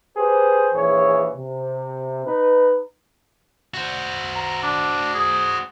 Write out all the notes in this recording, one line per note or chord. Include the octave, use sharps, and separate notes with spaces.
G4 G#4 B4 C5
A#1 E3 G#4 C#5
C3
D#4 B4
F#4 C5
A#5
D4
G#4